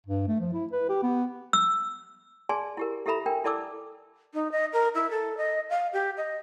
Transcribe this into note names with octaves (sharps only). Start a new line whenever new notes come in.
G2
A3
F3
E4
B4
G4
B3
E6
G#4 D5 G#5 A5 C6
E4 G4 A#4
E4 G4 A4 E5 A#5 B5
D4 A#4 G5
E4 A4 D5 A5 D6 E6
D#4
D#5
A#4
E4
A4
D#5
F5
G4
D#5